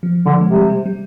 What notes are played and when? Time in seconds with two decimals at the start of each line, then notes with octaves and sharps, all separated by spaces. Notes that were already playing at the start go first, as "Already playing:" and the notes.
0.03 F3
0.26 D3 F3
0.41 G#3
0.48 C3
0.55 G3
0.70 G#3
0.86 G3